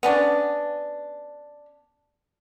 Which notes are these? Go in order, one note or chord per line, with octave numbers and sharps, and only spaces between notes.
B3 C#4 D4